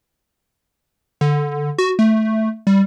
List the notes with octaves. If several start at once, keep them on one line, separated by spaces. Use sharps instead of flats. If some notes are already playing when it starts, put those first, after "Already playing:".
D3
F#4
A3
G3